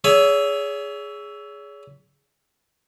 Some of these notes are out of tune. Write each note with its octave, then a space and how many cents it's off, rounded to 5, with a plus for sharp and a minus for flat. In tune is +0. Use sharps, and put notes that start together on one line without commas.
G#4 +0 C#5 +35 E5 +0